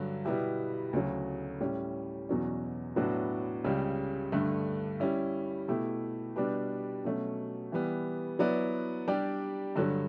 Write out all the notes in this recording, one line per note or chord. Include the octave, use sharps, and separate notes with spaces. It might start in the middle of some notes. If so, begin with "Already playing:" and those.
Already playing: G2 D3 F#3
B2 G3 B3 E4 G4
D2 C#3 F#3
A2 G3 C#4
E2 B2 F#3 C#4
A2 F#3 B3 D4 F#4
C#2 C#3 G3
G2 D3 A3
G3 C#4 E4
B2 A3 E4 G4
B2 G3 D4 G4 B4
B2 F#3 A3 C#4
E3 G3 B3
F#3 B3 E4 B4 D5
G3 D4 G4 D5
G2 D3 F#3